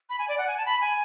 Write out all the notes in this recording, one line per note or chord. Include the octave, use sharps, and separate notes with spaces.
B5
G#5
D5
F#5
G#5
A5
B5
G#5